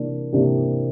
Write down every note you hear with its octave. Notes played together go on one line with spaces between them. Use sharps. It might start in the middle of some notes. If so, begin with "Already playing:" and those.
Already playing: C3 E3 A#3 D4
C3 E3 A#3 D4 G4